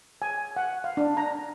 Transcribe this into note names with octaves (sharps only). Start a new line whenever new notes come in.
G#5
F#5
F5
D4
A#5